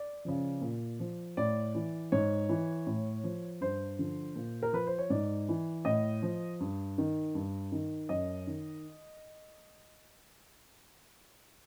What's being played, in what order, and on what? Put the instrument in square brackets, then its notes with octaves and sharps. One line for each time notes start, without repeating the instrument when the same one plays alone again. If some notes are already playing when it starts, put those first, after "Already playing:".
Already playing: [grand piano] D5
C#3 F3
A#2
F3
A2 D5
E3
G#2 C#5
E3
A2
F3
G2 C5
D3 F3
A#2
A#4
F3 B4
C5
C#5
G#2 D5
E3
A2 D#5
F3
G2
D#3
G2
D#3
F#2 D#5
D#3